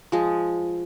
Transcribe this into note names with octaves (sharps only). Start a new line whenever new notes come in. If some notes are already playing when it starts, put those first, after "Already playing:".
F3 G#3